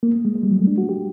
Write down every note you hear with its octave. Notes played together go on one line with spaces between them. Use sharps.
A#3
G#3
G#3
G3
F#3
A3
D4
F#4
G4